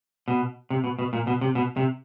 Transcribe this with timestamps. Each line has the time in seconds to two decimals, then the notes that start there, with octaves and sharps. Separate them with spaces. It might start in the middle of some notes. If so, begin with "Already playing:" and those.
0.28 B2
0.70 C3
0.84 B2
0.99 B2
1.13 A#2
1.27 B2
1.41 C3
1.55 B2
1.77 C3